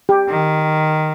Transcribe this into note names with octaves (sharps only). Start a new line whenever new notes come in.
G4
D#3